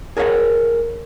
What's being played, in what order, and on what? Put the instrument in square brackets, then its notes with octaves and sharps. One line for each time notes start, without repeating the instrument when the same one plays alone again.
[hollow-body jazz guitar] G#4 A#4 C#5 E5 F#5